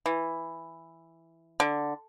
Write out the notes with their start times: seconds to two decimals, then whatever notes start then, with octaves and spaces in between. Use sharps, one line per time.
0.06 E3
1.60 D3